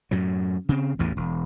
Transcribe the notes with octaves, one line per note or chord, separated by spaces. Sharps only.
F#2 A2 F#3
C#3 C4
A1 E2 A2 E3
E1